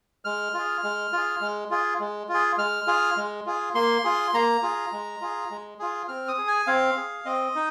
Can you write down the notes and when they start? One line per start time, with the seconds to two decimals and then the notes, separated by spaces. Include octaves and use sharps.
0.25 G#3 F6
0.54 F4 G#4
0.84 G#3
1.12 F4 G#4
1.41 G#3
1.71 F4 G#4
2.00 G#3
2.29 F4
2.34 G#4
2.58 G#3 F6
2.87 F4 G#4
3.17 G#3
3.46 F4 G#4
3.75 A#3 C6
4.04 F4 G#4
4.34 A#3 A#5
4.62 F4 G#4
4.93 G#3
5.21 F4 G#4
5.51 G#3
5.79 F4 G#4
6.08 C4 F6
6.28 D#6
6.38 G#4
6.48 G#5
6.67 C4 F5
6.97 G#4
7.25 C4 D#5
7.55 D#4